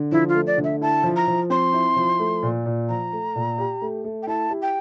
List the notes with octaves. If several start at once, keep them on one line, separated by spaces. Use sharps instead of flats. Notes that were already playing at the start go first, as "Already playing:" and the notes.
Already playing: D3
F3 E4
F4
A3
D5
D3
E5
E4 A5
F3
A#5
F3
C4 C6
E4
F3
A3
A#2
A#2
F3 A#5
A3
A#2
G4
A3
A3
G5
E4 A5
G4
G5